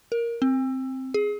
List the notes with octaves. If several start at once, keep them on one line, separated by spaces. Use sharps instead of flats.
A#4
C4
G#4